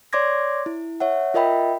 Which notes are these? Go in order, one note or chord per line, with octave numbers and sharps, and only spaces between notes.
C#5 D5 C6 D6 G#6 A#6
E4
C#5 E5 F#5
F4 A#4 D#5 E5 G5 B5